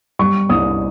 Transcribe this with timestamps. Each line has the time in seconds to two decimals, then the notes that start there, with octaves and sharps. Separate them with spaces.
0.19 G3 C#6
0.49 C2 D#6